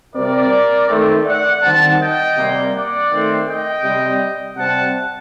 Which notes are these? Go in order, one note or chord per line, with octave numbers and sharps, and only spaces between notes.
C3 G3 C4 A#4 D5
D#3 A3 C4
D5 F#5
D#3 G3 C4 F#5 A5
D#5 G5
C3 G3 A#3
D5 F#5
D#3 A3 C4
D#5 G5
C3 G3 C4
C3 G3 C4 F#5 A5